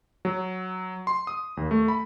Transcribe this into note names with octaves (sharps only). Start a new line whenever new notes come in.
F#3
C6
D#6
D#2
A3
B5